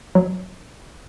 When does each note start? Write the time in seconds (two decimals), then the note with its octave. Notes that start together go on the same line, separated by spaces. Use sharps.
0.15 F#3